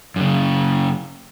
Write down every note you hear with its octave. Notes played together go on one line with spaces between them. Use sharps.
F#2 C#3